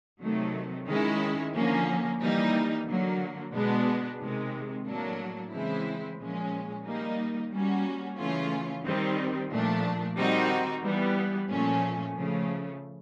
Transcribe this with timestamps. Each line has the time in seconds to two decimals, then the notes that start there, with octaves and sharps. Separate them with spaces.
0.21 C3 D#3 F#3 A3
0.87 D#3 G#3 C#4 E4
1.53 D3 F3 A#3 C#4
2.20 E3 G3 A#3 D#4
2.87 D3 F#3 A#3
3.53 B2 G#3 B3 D4
4.19 C3 D#3 G#3
4.86 A2 F#3 A#3 D4
5.51 C#3 E3 G#3 C4 E4
6.18 A#2 F3 G#3 C#4
6.85 D#3 G3 A#3 D#4
7.51 G3 A#3 C#4 F#4
8.18 C#3 E3 A3 C#4 F4
8.83 D#3 G3 C4
9.49 A#2 F3 A3 D4
10.16 D#3 G3 C4 D#4 F#4
10.83 E3 G3 B3
11.50 A#2 F3 A3 C#4
12.16 C#3 F3 A3